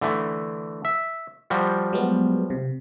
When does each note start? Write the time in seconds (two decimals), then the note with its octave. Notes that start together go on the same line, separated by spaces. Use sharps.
0.01 D3 E3 A3
0.85 E5
1.50 F3 G3 F#4
1.93 F#3 G#3 B3
2.50 C3